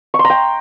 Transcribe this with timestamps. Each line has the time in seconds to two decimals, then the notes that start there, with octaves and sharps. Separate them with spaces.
0.14 C#6
0.19 C6
0.24 A#5
0.30 G5